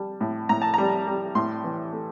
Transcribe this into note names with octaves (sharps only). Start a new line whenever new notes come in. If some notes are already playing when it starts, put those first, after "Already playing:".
Already playing: G3 A5
A2
A2 A#5
A5
G3 A#5
G3
A2 C6
E3
A3